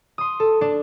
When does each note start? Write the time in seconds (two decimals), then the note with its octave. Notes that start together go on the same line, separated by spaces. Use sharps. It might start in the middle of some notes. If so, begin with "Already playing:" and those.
0.18 C6 D#6
0.40 A4
0.61 D4